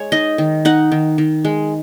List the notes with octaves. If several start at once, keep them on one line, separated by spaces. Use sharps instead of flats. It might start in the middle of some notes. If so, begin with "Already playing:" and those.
Already playing: G#3 C#5
D#4 D#5
D#3
D#4 F#5
D#3
D#3
G#3